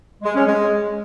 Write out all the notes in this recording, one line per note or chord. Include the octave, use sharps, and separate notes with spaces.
G#3
C#4
G#3